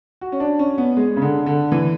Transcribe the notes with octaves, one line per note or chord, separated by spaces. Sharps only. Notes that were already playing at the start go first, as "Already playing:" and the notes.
F#4
C#4
D4
C#4
B3
G#3
C#3
D3
D3
E3